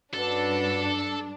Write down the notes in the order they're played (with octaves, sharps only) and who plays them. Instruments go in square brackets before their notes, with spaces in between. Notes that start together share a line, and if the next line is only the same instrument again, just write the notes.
[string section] G2 D4 [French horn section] C#4 F#4 B4 [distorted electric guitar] A4